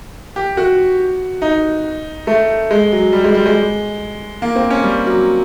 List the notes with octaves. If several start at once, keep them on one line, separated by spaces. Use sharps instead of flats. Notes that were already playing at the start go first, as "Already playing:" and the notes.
G4
F#4
D#4
A3
G#3
F#3
G3
G#3
G3
G#3
A#3
C4
C#4
G3
F#3